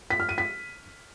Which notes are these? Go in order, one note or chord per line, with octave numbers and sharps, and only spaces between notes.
B6
F6
D#7
B6